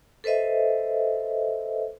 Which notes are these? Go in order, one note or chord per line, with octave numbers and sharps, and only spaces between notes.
A4 B4 C5 D#5 E5